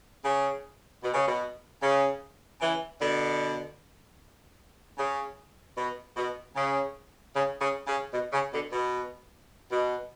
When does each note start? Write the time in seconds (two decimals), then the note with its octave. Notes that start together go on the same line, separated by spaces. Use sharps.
0.24 C#3
1.03 B2
1.14 C#3
1.26 B2
1.82 C#3
2.61 C#3 E3
3.01 B2 D3
4.98 C#3
5.77 B2
6.16 B2
6.56 C#3
7.35 C#3
7.60 C#3
7.87 C#3
8.13 B2
8.33 C#3
8.53 B2 D3
8.72 B2
9.71 B2